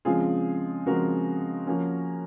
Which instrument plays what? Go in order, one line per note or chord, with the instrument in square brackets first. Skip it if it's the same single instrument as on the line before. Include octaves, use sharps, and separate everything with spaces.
[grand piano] C#3 F3 G#3 C4 F4 G#4
C#3 F3 G#3 C4 F#4 A#4
F3 A#3 C#4